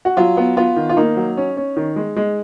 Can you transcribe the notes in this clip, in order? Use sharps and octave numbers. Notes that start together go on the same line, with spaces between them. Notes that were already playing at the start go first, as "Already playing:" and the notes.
F#4
F#3 F4
B3
B3 F4
D#3
F4
A#3 D#4
F#3
C#4
C#4
D#3
G#3
G#3